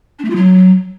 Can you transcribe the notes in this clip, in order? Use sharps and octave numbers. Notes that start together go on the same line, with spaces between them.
D4
A3
F4
F#3